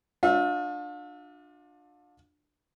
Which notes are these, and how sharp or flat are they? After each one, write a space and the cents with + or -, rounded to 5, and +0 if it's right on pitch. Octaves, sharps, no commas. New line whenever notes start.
D4 +15 F4 +40 E5 +0